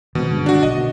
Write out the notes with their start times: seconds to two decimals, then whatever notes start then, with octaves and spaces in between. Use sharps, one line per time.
0.15 B2 D#3 G#3 C4
0.30 G2 D3 G#3
0.46 D4 F#4
0.63 B1 D#5
0.75 B2 D#3